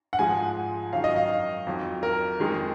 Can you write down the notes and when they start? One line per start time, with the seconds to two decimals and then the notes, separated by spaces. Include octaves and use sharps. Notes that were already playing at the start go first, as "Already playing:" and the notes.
0.13 F#5
0.19 G#2 F3 G#3 G#5
0.93 F#2 D#3 F#3 F5
1.04 D#5
1.16 F5
1.67 F2 D#3 F#3
2.03 A#4
2.40 F2 D#3 G#3